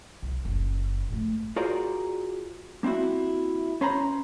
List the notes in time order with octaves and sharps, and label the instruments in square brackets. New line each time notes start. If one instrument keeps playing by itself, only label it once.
[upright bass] C2
F#1
G#2 A3
[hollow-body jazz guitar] F4 F#4 G#4 A#4 C5 D5
A#3 C4 D4 E4 F#4
C#4 B4 C5 G#5 A#5 B5